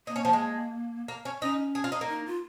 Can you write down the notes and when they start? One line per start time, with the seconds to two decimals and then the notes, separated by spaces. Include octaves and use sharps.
0.07 A#3 D#4
0.16 C#4
0.25 F3
0.33 G#3
1.08 A#3
1.25 C#4
1.42 C#4 D#4
1.75 G#4
1.84 F4
1.92 D#4
2.01 A#3
2.09 D#4
2.26 F4